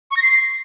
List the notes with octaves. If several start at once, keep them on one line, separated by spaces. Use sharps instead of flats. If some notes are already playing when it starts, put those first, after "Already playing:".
C#6
A#6
C7